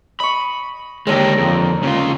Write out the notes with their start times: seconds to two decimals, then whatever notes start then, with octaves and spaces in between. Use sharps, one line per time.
0.20 D#5 B5 C#6
1.07 D#2 D3 G#3 G4 A#5
1.38 F2
1.83 C#3 F4